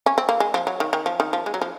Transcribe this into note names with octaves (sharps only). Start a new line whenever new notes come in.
C#4
C4
A#3
G#3
F3
F#3
D#3
D#3
F3
D#3
F3
G#3
F#3
F3